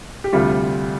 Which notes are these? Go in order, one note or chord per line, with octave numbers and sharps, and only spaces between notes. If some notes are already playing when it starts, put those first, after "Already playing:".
G4
D2 C3 G3 F4